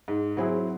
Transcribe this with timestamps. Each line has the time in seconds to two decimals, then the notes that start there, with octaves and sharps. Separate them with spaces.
0.08 G#2
0.37 F#3 C4 E4 G#4